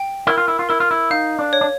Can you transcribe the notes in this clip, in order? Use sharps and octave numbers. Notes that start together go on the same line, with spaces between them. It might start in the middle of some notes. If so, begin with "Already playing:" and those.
Already playing: G5
E4 A#4
F4
E4
F4
E4 A#4
F4
E4
D#4 F5
D4
C#5
D4